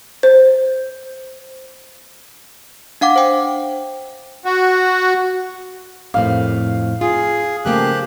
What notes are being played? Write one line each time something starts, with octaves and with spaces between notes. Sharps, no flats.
C5
D4 F5 F#5 D6
C5 G5
F#4
F2 A2 C4 F5
F4 G#4
C#3 F3 A3 A#3 G4 F#6